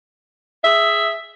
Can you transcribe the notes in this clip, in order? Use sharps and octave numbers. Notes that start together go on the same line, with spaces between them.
G#4 E5